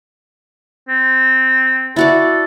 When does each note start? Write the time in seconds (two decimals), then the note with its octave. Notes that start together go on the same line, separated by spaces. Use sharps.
0.89 C4
1.96 E4 F#4 A4 D5